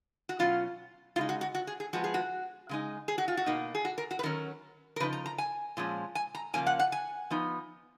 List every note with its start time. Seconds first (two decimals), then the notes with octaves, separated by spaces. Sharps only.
0.29 F#4
0.39 B2 F#3 C#4 F4
1.16 C#3 G#3 D#4 F4
1.29 F#4
1.41 F#4
1.55 F#4
1.67 G#4
1.80 G#4
1.93 F3 G#3 B3 F#4
2.04 G#4
2.14 F#4
2.69 C#3 G#3 D#4
3.08 G#4
3.18 F#4
3.28 F4
3.37 F#4
3.46 B2 A#3 D#4
3.75 G#4
3.85 F#4
3.98 A#4
4.11 F#4
4.19 B4
4.23 D#3 F#3 C#4 A#4
4.96 A#4
5.00 C#3 F3 D#4 B4
5.13 A#5
5.26 A#5
5.38 G#5
5.77 A#2 F3 G#3 C#4
6.15 G#5
6.35 A#5
6.54 C#3 F3 A#3 C#4 G#5
6.66 F#5
6.79 F#5
6.92 G#5
7.31 F3 B3 D#4